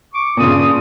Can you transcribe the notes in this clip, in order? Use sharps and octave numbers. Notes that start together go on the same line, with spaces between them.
C#6 D6
G2 A#2 C#3 F4 D#6